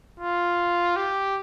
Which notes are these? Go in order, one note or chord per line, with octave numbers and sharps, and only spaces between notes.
F4
G4